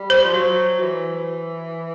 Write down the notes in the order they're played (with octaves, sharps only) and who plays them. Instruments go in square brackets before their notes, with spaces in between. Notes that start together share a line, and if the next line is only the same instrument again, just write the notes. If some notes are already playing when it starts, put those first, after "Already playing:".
Already playing: [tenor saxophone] G3
[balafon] C5
[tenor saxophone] F3
F#3
E3